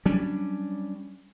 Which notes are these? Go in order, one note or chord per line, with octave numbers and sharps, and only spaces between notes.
F#3 G3 C#4 D4